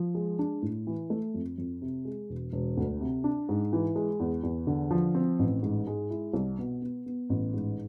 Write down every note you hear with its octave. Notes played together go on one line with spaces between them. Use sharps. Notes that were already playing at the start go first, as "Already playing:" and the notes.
Already playing: F3
G#3
D4
A2
E3
A3
F2
F2
C3
G#3
E1
E1
D2
C3
D4
G#2
E3
G#3
E2
E2
D3
F3
C4
A1
G#2
G#3
E4
C2
B2
B3
B3
A1
G#2